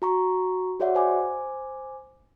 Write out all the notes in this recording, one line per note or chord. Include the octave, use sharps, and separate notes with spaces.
F#4 A#5 C#6
F#4 G#4 C#5 D5 E5 F#5
C5 G#5 D6